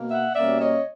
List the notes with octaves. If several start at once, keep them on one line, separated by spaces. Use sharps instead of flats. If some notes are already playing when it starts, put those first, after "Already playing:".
Already playing: B2 A#3
E5 F#5
B2 G3 A#3 C#4 D5 E5
C#5 D#5